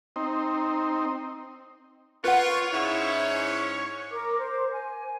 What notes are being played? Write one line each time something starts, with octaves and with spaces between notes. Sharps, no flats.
C4 D#4
F4 B4 C#5 F#5
G#2 C#4 E4
A#4 D6
C5
G#5